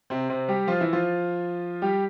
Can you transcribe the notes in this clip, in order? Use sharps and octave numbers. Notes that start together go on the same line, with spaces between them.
C3 C4
C3 C4
G3 G4
F3 F4
E3 E4
F3 F4
G3 G4